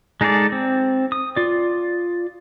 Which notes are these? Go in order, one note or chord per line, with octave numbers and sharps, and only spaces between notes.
G#3 D#4 G#4 A4 D5
C4
D#6
F4 D5